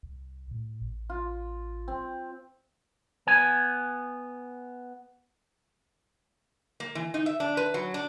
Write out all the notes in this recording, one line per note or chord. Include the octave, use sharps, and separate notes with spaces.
C2
A2
A1
F4
C4
B3 G#5
A#3
E3
D#4
E5
D4
B4
F#3
D4